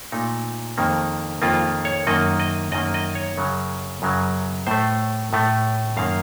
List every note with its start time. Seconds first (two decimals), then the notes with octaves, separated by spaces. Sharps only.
0.12 A#2 A3 D#4
0.78 F2 D#3 A#3
1.42 F2 D#3 A#3 F4
1.85 C#5
2.07 F#2 D#3 A#3 D#5
2.39 D#5
2.72 F#2 D#3 A#3 D#5
2.94 D#5
3.15 C#5
3.37 F#2 C#3 F#3
4.02 F#2 C#3 F#3
4.67 A2 A3 C5
5.33 A2 A3
5.97 F#2 D#3 A#3 F5